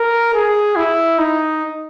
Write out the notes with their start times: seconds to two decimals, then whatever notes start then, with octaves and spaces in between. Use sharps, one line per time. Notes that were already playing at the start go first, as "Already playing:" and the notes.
Already playing: A#4
0.34 G#4
0.76 E4
1.19 D#4